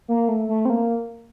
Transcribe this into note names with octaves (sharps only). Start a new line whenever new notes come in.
A#3
A3
A3
C4
A#3